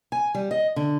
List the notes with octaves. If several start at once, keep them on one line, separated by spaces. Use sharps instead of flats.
G#5
G3
D#5
D3